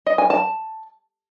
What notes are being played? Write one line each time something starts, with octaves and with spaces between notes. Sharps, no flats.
D#5
G#5
A5